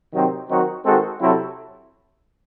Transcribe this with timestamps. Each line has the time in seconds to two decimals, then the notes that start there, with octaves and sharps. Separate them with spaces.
0.13 C3 D#3 F#3 C4
0.49 D#3 F#3 C4 D#4 F#4
0.85 D#3 G#3 C4 F#4 A4
1.19 C3 F#3 C4 E4 A4